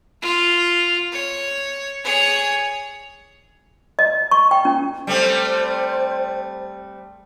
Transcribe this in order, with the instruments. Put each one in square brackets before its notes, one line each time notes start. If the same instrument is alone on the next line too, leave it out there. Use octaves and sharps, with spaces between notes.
[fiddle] F4
C#5
G#4 C#5
[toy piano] D#5
C#6
G5
C#4
[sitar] G3 A3 C4 [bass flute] C5